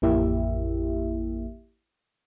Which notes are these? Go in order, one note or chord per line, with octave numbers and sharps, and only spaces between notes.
A1 F2 A#3 E4 G4 E5